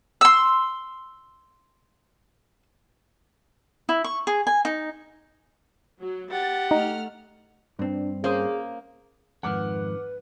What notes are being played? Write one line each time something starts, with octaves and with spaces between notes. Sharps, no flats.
C6 E6
E4
C#6
G#4
G#5
D#4
F#3
G4 F#5 A6
A3 D#4 F6
G2 C4 D4
A#3 C#4 G#4 C5 D#6
F2 G#2 D#3 B4 F#5 D6 F6